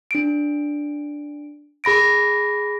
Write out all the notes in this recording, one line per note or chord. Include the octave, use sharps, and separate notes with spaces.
D4 D7
G#4 B5 A#6 D7